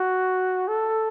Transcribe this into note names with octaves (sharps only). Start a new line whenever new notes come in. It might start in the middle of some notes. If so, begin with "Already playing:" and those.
Already playing: F#4
A4